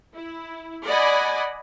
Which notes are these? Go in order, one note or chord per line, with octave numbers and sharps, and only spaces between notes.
E4
D5 D#5 F#5 G#5 B5